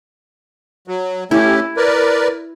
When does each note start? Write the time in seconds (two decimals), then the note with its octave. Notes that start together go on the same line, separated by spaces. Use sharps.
0.88 F#3
1.31 A3 C#4 E4 G4
1.77 A#4 B4 D5